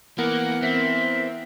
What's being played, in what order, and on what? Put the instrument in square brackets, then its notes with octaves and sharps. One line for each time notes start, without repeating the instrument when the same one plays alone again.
[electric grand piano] E3 B3 A#4 [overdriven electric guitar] A#3 [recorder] F#5
[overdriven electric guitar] C4 [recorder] E5